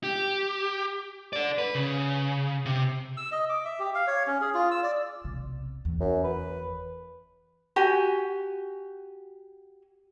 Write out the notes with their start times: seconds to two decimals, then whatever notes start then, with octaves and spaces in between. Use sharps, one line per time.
0.04 G4
1.33 A4 D5
1.58 B4
1.75 C#3
2.66 C3
3.17 E6
3.32 D#5
3.49 D6
3.65 E5
3.79 G4
3.95 F5
4.07 C#5
4.27 C#4
4.41 G#4
4.54 F4
4.71 E6
4.83 D5
5.25 B1 C3
5.85 F#1 E2
6.00 F#2
6.24 B4
7.76 F#4 G4 G#5